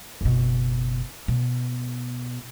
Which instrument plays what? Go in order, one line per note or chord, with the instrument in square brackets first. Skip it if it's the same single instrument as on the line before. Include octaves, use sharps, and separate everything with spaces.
[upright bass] F#1 B2
B2